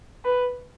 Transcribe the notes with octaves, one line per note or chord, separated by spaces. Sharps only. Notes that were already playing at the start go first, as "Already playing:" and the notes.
B4